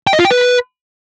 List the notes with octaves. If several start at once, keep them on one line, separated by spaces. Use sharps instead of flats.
G5
D#5
F4
G5
B4